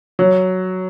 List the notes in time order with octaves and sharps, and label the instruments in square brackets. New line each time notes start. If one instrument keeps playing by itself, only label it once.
[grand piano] F#3